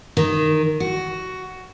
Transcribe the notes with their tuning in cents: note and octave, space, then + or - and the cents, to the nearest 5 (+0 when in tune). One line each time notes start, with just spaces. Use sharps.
D#3 -10
F#4 +10